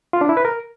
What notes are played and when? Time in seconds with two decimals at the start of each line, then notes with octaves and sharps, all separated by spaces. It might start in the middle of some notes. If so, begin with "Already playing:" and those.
0.13 F4
0.21 D4
0.29 E4
0.37 B4
0.45 A#4